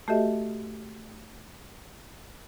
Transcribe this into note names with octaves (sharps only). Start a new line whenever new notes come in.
A3 F#4 G4 A4 D#5 E5